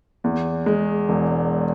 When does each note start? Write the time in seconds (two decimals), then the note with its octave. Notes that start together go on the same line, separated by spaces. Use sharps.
0.24 E2
0.66 G#3
1.09 E1